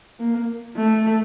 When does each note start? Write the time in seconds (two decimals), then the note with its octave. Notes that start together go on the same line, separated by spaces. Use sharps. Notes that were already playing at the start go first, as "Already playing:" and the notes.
0.19 A#3
0.77 A3